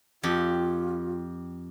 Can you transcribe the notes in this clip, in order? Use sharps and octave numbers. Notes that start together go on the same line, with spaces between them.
F2 F4 G4